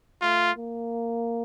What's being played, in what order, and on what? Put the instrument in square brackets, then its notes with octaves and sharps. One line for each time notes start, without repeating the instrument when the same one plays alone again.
[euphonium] A3 [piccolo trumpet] F4
[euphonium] A#3